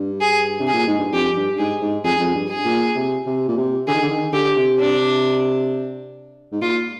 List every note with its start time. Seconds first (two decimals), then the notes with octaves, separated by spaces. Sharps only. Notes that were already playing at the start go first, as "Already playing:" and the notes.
Already playing: G2
0.21 G#4
0.60 C3
0.67 G#4
0.74 A#2
0.87 G#2
0.99 G2
1.12 F2 G4
1.36 G2
1.58 G#2 G#4
1.82 G#2
2.04 F2 G#4
2.20 F2
2.35 G2
2.50 G#4
2.65 A#2
2.96 C3
3.27 C3
3.48 A#2
3.58 C3
3.88 D3 G#4
3.94 D#3
4.02 D3
4.11 D#3
4.33 D3 G4
4.57 C3
4.79 D4
6.52 G#2
6.62 A#2 F4